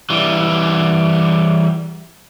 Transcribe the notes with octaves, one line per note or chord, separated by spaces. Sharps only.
E3 G3